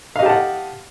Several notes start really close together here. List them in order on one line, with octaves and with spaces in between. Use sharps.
F5 D#5 G4 A5 F#5